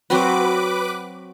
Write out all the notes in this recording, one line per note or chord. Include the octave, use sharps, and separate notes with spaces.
F#3 C4 F#4 B4 D6